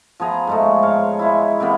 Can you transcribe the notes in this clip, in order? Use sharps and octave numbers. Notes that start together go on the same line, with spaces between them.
F3 B3 G#4 A#5
G#2 G#3 A3
G#2 C#5 F5
G#3 E4
C3 E3 A#3 B3